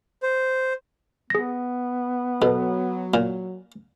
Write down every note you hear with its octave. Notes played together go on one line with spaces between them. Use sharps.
C5
B3 G#4 A#6
B2 F#3 A4 B4
A#2